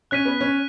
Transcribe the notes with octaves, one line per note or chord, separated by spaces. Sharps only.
C#4 F#6 B6 D#7
B3
C#4